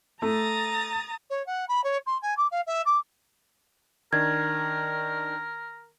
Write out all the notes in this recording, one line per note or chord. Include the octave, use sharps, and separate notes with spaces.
A3 A#5 D#6 A6
C#5
F#5
B5
C#5
C6
G#5
D6
F5
E5
D6
D#3 D4 A#4 G#6